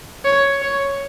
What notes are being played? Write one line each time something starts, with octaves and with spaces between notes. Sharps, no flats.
C#5
C#5